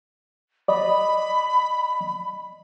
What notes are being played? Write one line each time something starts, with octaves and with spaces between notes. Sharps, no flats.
D5 D#5 B5